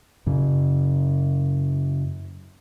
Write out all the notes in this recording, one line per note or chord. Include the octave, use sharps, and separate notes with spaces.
F#2 C#3